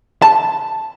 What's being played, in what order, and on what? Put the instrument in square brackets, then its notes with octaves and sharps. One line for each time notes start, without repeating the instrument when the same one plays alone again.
[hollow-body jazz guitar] A5